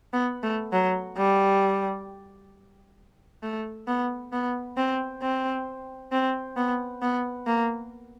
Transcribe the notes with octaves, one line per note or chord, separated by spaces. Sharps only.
B3
A3
F#3
G3
A3
B3
B3
C4
C4
C4
B3
B3
A#3